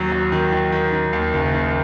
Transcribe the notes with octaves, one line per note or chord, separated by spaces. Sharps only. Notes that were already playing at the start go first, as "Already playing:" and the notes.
Already playing: D#2 F#3
F#3
D#3
D#3
D#3
D#3
D#2
F#1
D#3